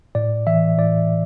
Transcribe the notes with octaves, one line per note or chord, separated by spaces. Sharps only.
A2 D5
E3 E5
A2 D5